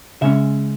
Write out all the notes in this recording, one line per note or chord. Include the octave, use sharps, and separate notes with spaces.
C#3 G#3 C#4 E5